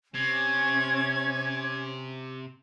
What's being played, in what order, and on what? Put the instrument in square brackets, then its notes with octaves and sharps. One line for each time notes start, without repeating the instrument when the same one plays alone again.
[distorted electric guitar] C3 [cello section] C#4 [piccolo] G#6